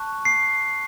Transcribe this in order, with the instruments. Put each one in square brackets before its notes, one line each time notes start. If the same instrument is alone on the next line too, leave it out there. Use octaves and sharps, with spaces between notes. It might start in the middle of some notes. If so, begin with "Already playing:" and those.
Already playing: [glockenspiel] A5 C#6 F#6
C7